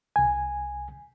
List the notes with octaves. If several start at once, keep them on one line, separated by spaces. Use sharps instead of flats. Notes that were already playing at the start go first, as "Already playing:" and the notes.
C2 G#5